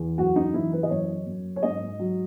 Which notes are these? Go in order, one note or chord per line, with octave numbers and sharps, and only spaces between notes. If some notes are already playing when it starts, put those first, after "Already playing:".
Already playing: E2
F#2 F#4
D#4
E3 E4
B4
D#5
F#2 C#5
F#2
C#5
G#2 D#5
F#3